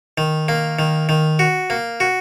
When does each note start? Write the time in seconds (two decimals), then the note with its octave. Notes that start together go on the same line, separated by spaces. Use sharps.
0.18 D#3
0.48 A#3
0.79 D#3
1.09 D#3
1.39 F#4
1.70 A#3
2.00 F#4